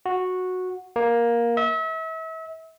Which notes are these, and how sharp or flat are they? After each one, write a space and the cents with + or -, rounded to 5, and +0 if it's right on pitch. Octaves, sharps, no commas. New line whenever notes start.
F#4 -10
A#3 +10
E5 -35